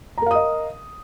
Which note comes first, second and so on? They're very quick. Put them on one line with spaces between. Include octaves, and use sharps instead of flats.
A#5 A#4 F5 D#6 D#5